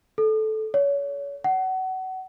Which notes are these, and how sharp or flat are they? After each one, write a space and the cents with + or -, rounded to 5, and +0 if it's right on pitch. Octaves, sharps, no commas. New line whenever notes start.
A4 -15
C#5 +30
F#5 +25